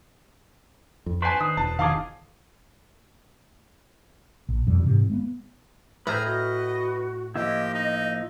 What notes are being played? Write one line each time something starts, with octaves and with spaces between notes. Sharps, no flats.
F2
D4 B4 C5 G#5 A5 C6
D#3 D#6
E1 A5
D#3 F3 G#4 F5 A5 D6
A#1
F2 B2 G3
G#2 C3 E3
G#3 A#3 B3
A2 G#4 B4 C5 A#5 F6 G6
F#4 D#5
F3 A#3 E4 G4 D#5
D#4